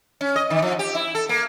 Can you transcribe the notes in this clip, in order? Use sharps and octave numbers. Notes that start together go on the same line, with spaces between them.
C#4
D#5
D#3
F3
G4
E4
A4
A#3